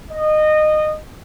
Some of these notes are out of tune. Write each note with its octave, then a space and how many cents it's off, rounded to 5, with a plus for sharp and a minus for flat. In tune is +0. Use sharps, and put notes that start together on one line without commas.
D#5 -20